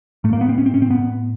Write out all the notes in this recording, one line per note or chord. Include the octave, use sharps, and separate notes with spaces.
A2 A3
A#3
B3
C4
C#4
C4
C#4
C4
A2 B3